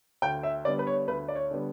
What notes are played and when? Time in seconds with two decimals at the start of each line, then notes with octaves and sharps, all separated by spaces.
0.22 D2 G5
0.43 E5
0.65 D3 G3 B3 D5
0.79 B4
0.87 C#5
1.08 D2 B4
1.28 D5
1.35 C#5
1.51 D3 G3 B3